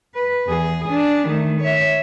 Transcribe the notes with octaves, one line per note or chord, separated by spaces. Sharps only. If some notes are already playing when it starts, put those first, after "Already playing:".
B4
E2 G#4
D4 G#4
D#3 A3
C#5 E5